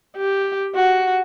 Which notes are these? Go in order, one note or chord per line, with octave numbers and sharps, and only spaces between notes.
G4
F#4